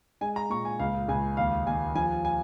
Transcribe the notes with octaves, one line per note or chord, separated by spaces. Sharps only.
G#3 G#5
A#5
A#2 C#6
G#5
C#2 F5
C#2 G#5
D#2 F5
D#2 G#5
F3 G#5
G#5